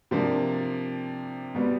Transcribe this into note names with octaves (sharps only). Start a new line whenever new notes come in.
C3 F3 A#3 D4
B2 G3 B3